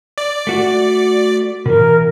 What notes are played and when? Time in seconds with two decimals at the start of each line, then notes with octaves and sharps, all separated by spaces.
0.18 D5
0.47 A3 F#4 F#5
1.66 B2 E3 A#4